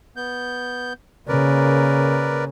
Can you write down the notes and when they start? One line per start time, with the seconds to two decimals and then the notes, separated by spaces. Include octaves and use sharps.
0.16 B3 G6
1.28 C#3 A#3 A#4 B4 D5